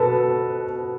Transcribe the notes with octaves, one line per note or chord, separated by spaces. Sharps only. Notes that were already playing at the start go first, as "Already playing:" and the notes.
Already playing: B2 A4 B4